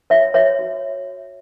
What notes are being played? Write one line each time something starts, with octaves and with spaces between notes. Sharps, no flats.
F#4 C#5 E5
F#4 C#5 E5
F#4